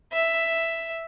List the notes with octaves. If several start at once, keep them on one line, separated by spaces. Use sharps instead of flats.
E5